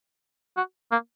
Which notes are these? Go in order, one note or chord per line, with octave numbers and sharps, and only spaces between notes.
F#4
A#3